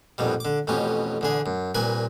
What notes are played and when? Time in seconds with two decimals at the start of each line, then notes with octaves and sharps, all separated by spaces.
0.18 A#1 F2 B2 G3
0.40 D3 D6
0.67 A1 F2 B2 C#4 G4
1.21 E2 D3 G#4
1.46 F#2
1.75 C2 A#2 B4 G#5